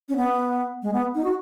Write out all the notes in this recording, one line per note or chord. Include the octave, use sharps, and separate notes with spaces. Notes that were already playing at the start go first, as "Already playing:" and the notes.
C#4
B3
G#3
B3
D#4
F#4